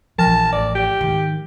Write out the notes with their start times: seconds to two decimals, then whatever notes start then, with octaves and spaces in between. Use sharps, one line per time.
0.18 A#1 E3 F3 A5 F6 A#6
0.52 A1 D5
0.75 G4
1.01 G#2 D#3